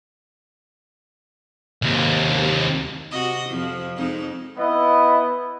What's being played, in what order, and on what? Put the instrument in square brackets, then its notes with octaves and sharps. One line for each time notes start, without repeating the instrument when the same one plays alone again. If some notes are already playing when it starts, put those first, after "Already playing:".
[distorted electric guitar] D#2 C3
[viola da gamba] C3 F#4 D#5
F2 F3
F2 G#3 D#4
[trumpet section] B3 E4 B4 D#5